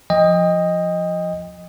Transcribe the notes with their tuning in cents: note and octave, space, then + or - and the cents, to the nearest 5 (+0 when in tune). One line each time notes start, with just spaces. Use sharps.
F3 +0 D#5 +0 G5 +30